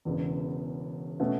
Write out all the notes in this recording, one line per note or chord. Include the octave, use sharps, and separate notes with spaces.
E1 E2 C#3
B2 A3 C#4